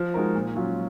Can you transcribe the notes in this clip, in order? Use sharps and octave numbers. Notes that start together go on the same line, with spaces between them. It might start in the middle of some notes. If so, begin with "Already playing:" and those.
Already playing: F3
G#3 D#4 F#4 A#4
A#2
F#3 C#4 F4